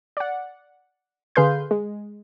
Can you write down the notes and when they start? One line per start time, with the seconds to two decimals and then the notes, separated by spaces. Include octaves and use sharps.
0.17 D5 F#5
1.36 D3 G#4 B4 F5 C6 G6
1.71 G#3